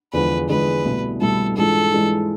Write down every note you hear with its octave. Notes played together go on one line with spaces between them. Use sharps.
E2 D3 F3 G#3 B4
E2 D3 F3 G#3 B4
C2 B2 A3 E4
C2 B2 A3 E4 A4
G#2 E3 G#3 D4 F4 A4
G#2 E3 G#3 D4 F4